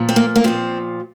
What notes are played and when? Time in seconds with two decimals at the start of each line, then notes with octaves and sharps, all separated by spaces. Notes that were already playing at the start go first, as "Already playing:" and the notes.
Already playing: A#2 F3
0.09 C4
0.16 A#3
0.36 A#3
0.44 A#2 F3 C4